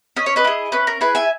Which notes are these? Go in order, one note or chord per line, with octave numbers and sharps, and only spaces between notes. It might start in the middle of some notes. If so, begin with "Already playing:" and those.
C#4 D#5
C#5
B4 D#5
E4 G#4
C#4 B4
A#4
E4 G#4 B4
E5 G#5